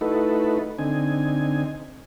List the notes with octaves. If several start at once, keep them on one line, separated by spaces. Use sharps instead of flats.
A3 D#4 E4 F#4 A4 B4
D3 C4 D#4 G#5